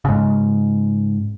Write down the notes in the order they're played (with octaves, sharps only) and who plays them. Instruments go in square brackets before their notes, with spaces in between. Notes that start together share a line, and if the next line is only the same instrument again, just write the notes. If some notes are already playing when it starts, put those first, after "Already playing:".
[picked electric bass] G#2 C#3